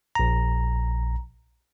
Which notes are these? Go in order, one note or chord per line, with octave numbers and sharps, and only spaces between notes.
A#1 A#5